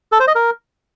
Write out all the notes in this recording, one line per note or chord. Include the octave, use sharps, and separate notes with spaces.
A4
C5
D#5
A#4